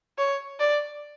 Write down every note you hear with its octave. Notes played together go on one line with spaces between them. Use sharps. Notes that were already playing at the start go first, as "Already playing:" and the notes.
C#5
D5